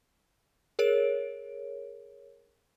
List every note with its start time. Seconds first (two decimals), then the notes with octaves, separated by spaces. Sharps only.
0.79 G#4 A#4 C#5 D7